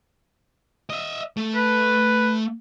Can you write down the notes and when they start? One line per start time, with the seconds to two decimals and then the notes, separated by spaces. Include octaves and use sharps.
0.90 D#5 E5
1.37 A3
1.56 B4